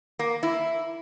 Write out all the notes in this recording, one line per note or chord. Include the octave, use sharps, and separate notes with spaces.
A#3
E4